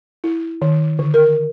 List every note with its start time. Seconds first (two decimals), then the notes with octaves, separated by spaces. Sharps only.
0.24 E4
0.62 D#3
0.99 D3
1.14 A#4